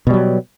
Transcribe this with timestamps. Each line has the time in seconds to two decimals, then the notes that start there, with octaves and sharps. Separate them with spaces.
0.07 B2
0.10 G3
0.14 F#3